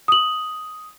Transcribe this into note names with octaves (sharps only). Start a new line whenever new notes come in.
D#6 F#7